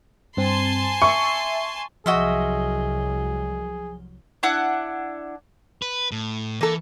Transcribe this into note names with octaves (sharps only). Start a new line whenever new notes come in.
G2 C4 G#5 A5 C6
E5 C#6
C2 F3 F#3 F#4 G#4 D#5 E5 G7
D4 E4 F#5
B4
A2
E3 A#3 A4